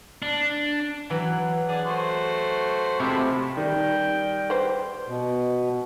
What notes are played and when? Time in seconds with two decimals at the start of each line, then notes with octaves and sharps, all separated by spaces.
0.22 D4
1.10 E3 F#3
1.68 D4 G#4 F#5
1.85 A3 F#4 C5
3.00 C3 F3 G#3 A3 E4
3.57 D#3 G3 G5
4.50 B4 C5
5.09 B2